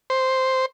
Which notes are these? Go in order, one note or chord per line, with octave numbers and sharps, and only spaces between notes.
C5